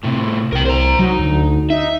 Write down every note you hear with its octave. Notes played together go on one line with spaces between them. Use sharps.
A2 C3
C2 A#4 G5
C5 A#5
F#3 D#4
D2
D#4 E5